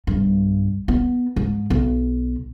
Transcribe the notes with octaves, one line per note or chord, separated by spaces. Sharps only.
B1 G2
B3
G#2
B1